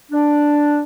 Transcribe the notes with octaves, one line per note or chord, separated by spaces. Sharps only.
D4